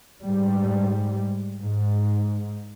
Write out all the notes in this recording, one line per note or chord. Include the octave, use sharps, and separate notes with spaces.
G#2 G3
G#2